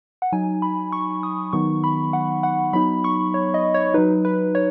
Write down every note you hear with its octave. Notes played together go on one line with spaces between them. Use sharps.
F#5
F#3 D#4 G#5
B5
C#6
D#6
D#3 F#3 B3 D#4 C#6
B5
F#5
F#5
F#3 B3 D#4 B5
C#6
C#5
D#5
C#5
F#3 D#4 B4
B4
C#5